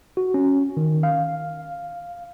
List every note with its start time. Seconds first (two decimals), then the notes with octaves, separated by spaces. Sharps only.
0.17 F#4
0.34 C#4
0.77 D#3
1.03 F5